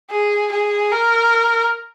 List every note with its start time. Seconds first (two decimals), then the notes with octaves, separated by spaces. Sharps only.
0.10 G#4
0.51 G#4
0.92 A#4